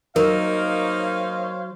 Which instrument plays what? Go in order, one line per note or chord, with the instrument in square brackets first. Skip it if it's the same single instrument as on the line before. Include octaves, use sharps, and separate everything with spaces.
[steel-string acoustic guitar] F#3 [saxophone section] A#3 D#4 [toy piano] A#4 [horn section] C5 C#5 F5